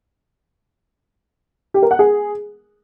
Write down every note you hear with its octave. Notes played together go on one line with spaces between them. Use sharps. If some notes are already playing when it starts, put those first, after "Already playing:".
G4
A#4
F#5
G#4